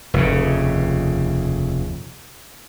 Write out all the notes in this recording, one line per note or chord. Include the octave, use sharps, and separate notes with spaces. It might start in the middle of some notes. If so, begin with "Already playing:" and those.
F1 D#2 C#3